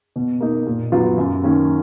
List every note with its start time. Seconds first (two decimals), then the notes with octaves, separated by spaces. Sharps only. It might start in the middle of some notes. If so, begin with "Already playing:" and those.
0.16 B2
0.40 A#3 D#4
0.66 A#2
0.92 F#3 B3 F4
1.18 F#2
1.43 D#3 A#3 C#4